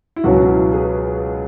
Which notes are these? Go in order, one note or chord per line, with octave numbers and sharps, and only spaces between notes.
E4
C#2 B2 F#3 C#4 F#4
E4
G#4 B4